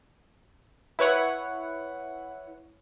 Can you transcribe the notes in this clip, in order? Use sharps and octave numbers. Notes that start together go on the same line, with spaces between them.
E4 B4 C#5 F#5